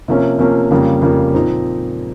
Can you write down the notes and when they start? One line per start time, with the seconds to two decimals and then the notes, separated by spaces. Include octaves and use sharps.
0.08 C3 F3 A#3 C#4
0.39 C3 F3 A#3 C#4
0.71 F2 C#3 G3 A#3
1.02 F2 C#3 G3 A#3
1.34 A#2 F3 C4 D#4